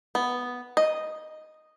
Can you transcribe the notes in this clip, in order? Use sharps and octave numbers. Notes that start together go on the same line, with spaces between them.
B3
D#5